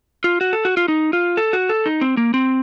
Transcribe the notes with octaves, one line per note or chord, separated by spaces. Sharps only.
F4
F#4
A4
F#4
F4
D#4
F4
A4
F#4
A4
D#4
C4
A#3
C4